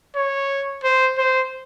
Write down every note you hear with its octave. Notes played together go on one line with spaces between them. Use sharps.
C#5
C5
C5